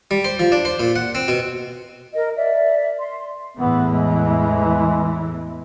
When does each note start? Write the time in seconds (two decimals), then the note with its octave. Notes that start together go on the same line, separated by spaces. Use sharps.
0.11 G3
0.25 C5
0.39 F3
0.52 D4
0.65 C5
0.80 A#2
0.96 F#5
1.15 C4
1.28 B2
2.14 A#4 D#5
2.36 D5 E5
2.99 C6
3.57 E2 A2 E3 B3
3.91 G#3